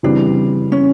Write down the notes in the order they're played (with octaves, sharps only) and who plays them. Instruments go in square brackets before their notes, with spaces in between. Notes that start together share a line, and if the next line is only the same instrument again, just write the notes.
[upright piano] C#3 E3 G3 C4 [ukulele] D4
[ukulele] C#4